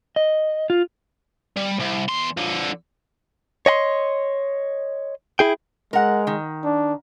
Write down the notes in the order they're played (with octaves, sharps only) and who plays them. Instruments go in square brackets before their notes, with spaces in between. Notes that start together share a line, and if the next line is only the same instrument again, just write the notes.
[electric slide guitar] D#5
F4
[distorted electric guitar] G3
C2
E2 C6
D3 F3
[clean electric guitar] C#5 D#5 G5 C6
E4 G#4 G5
[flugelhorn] G#3 [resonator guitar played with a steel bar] A#4 F#5
[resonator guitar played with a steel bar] D#3
[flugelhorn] D4